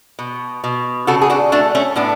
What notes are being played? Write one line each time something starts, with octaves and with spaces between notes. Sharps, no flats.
B2
B2
C#3 F#4 A4
G#4
D4 F#4
A3 D4 F#4
A3 C#4
A2 B3 D4